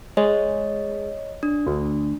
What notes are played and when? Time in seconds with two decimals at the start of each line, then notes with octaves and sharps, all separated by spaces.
0.17 G#3 C#5 D#5
1.43 D4
1.67 D2